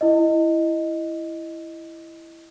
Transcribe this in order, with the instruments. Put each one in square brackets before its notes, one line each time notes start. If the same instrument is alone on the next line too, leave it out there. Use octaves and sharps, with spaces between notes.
[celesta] E4 D#5